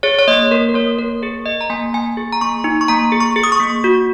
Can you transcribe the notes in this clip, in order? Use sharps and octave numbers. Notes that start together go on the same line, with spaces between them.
G#4 C#5
C#5
A#3 D#5
A#3 A#4
A#4
A#3 C#5
A#3 A#4
G#4 A#4
G#4 D#5
A#5
A#3 G#5
A#3 G#5
G#4
A#5
A#3 C#6
D#4
C#6
A#3 A#5
G#4
C#6
G#4
D#6
C#6
A#3
F#4